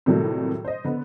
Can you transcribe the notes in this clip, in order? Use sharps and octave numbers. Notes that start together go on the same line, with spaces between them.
A2 C3 D#3 F#3 G3 A3
C5 D#5
D3 B3